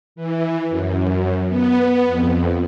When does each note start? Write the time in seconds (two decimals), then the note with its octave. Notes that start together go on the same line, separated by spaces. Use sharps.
0.16 E3
0.70 F#2
1.48 B3
2.08 F2